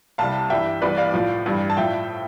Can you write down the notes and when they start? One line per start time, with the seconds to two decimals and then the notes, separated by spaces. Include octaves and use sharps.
0.18 C2 C3 G3 F5 A5
0.50 G2 E3 G3 E5 G5
0.82 C2 C3 E3 G3 B4 D5
0.97 D5 F5
1.14 A2 F3
1.46 G2 E3 G3
1.70 A5
1.77 A2 F3 E5 G5